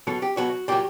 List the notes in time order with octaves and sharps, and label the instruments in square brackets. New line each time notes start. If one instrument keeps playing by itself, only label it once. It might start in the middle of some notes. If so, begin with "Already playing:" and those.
[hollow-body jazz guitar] B2 F#3 A4
G4
B2 F#3 F#4
A#2 F#3 G4